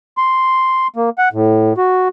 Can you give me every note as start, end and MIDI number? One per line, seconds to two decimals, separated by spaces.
0.17 0.87 84
0.96 1.10 58
1.18 1.29 78
1.33 1.73 45
1.77 2.08 66